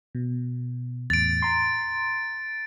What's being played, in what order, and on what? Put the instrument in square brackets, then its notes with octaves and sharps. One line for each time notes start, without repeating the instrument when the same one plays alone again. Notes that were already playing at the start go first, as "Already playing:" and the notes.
[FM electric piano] B2
[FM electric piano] E2 A2 [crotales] A6 D7
[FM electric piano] A#5 C6